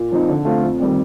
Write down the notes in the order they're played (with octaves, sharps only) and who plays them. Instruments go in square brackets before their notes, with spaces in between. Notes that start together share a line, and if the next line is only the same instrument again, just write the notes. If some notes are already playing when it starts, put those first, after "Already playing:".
Already playing: [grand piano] A#2
F3 C4 D#4
D3
A3 C4 F4
F2
D#3 G3 C4